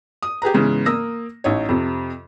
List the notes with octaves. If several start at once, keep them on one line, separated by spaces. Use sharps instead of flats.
D#6
G4 G#4 B4 A#5
G#2 C#3 E3 B3
A#3 D#6 E6 A#6
A1 D#4 C#5
F2 C3